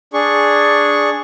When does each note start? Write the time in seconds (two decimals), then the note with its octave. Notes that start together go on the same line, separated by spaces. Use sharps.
0.13 D4 G#4 C#6